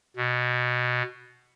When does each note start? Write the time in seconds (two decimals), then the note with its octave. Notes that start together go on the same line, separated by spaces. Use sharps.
0.16 B2